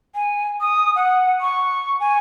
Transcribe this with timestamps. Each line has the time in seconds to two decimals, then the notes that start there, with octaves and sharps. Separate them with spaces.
0.15 G#5
0.61 D#6
0.96 F#5
1.41 C#6
2.00 G#5